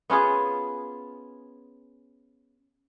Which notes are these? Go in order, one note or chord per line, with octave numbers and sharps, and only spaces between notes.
B3 C#4 F4 G#4